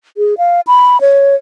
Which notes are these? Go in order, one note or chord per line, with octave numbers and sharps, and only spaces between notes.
G#4
F5
B5
C#5